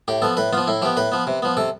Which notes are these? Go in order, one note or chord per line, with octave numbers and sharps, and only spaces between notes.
A2 G4
F3 B3 A4
A2 B4
F3 B3 F4
A2 E4
F3 B3 G4
A2 B4
F3 B3
C3
F3 B3
C3 A4